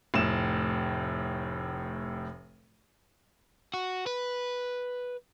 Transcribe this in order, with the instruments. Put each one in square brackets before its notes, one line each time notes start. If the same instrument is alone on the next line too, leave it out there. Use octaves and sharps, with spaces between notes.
[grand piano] F1 A2 E7
[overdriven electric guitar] F#4
B4